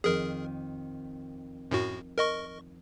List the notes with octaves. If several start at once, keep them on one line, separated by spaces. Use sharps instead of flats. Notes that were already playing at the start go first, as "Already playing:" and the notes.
F2 D#3 G#4 A#4
F#2 A2 F#4
A#4 D#5 C#6